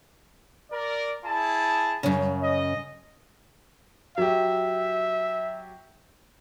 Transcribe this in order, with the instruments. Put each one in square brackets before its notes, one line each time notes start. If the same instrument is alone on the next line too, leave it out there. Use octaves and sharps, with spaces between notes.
[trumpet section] A#4 D5
E4 G#4 A5
[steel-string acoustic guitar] F#2 C#3
[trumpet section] D#5
[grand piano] F#3 G4 [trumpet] E5